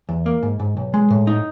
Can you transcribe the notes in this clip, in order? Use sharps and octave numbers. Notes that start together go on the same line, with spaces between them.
E2
A#3
G#2
G#2
B1
G#3
A2
D#4